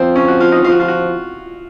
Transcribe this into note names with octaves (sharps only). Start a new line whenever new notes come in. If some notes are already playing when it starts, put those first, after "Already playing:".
Already playing: F3 C4
C#4
F#4
F4
D#4
F3 F4
F#4
F4
F#4